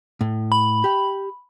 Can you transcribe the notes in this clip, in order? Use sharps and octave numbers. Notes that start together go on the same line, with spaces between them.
A2
B5
G4 G5